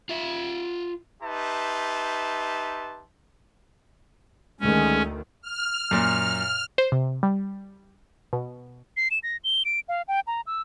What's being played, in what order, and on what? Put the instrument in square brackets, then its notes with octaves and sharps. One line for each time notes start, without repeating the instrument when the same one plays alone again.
[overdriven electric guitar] F4 E5
[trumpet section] D#4 G4 B4 E5 A5 C6
[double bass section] D2 D#3 A3 [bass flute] G#3 [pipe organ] C#4
[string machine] F6
[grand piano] F#2 A#2
[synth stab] C5
C3
G3
B2
[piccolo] C7
E7
A#6
G7
D7
F5
G5
A#5
E6